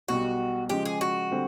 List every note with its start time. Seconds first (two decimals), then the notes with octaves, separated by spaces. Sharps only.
0.08 B1 B2 G3 F#4
0.69 C#3 F3 G#3 G4
0.85 G#4
1.01 F#4
1.31 D3 G3 C4